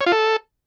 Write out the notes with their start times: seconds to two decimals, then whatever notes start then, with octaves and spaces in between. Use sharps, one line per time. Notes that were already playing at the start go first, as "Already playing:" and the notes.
0.01 C#5
0.06 F4
0.12 A4